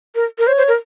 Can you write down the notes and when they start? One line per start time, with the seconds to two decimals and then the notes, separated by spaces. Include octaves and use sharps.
0.15 A#4
0.38 A#4
0.47 C5 C#5
0.58 C5
0.68 A#4